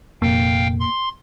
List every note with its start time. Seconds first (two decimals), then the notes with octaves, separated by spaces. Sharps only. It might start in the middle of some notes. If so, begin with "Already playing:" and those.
0.22 F1 A#2 A#3 F5 G5
0.80 C6